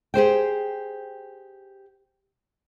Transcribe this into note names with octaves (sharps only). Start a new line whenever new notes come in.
G4 G#4 C5 G5